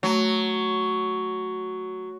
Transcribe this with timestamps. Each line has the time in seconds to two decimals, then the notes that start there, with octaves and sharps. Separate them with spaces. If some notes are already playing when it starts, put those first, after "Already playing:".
0.03 F#3 A3